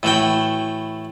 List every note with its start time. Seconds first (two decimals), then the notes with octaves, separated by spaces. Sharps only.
0.03 A2 E3 F#4 G5